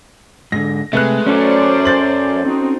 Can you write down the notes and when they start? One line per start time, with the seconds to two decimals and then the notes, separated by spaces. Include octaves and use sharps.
0.52 G#2 D3 A#6
0.93 C3 G#3 A3 B4 F#6
1.26 F#2 F#3 C#4 A4 C5 D5
1.85 G6 A6 F#7
2.45 C4 D#4 F#4